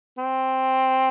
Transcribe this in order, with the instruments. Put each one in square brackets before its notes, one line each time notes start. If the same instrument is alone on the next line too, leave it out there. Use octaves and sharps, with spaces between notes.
[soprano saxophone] C4